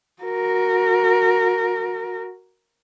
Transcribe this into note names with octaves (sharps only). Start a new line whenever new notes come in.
F#4 A#4